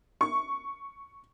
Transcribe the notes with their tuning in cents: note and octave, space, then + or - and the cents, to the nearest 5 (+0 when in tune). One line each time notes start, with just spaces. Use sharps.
C#6 +0